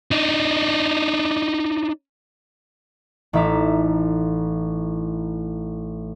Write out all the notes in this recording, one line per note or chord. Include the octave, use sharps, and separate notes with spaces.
D4 D#4
A1 D#4 E5 A#5 D6 E7